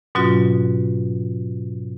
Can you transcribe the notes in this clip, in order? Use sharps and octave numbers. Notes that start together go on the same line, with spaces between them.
G#2 B2 F#3 C#4 F4 F#4